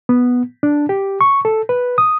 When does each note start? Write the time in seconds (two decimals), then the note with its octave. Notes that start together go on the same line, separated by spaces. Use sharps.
0.09 B3
0.63 D4
0.89 G4
1.21 C#6
1.45 A4
1.69 B4
1.98 D#6